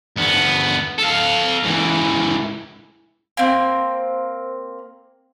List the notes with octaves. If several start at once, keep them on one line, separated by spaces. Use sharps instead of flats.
D2 B3
A4 F5
C#2 E3
A#3 C4